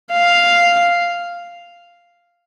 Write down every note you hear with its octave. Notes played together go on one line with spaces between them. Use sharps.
F5